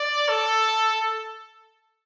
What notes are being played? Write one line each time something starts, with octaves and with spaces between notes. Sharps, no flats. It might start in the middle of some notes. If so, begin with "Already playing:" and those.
Already playing: D5
A4